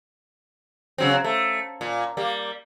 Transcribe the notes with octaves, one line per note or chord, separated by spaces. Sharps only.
C#3 F#3 C4
A3
A#2
G3 A#3